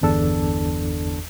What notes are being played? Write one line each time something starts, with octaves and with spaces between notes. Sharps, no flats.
G1 E2 D4 A4